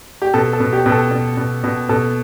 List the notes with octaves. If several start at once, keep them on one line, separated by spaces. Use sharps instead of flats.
G4
B2 A4
A4
B2
G4
B2
A4
B2
B2
B2
B2 A4